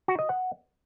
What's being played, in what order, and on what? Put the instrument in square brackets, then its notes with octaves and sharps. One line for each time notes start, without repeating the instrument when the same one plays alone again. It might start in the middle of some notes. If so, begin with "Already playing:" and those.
[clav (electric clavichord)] F#4
D#5
F#5